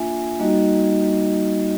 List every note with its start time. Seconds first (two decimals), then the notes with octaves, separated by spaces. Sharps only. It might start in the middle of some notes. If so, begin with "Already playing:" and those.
Already playing: A#3 D4 F4 E5 G#5
0.39 G3 A#3 D#4 F#4 D#5